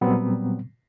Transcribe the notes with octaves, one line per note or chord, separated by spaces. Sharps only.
A#2 F#3 G3 B3 C4